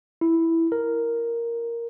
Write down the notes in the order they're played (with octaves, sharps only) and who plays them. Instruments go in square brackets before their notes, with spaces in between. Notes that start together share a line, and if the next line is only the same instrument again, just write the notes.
[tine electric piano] E4
A#4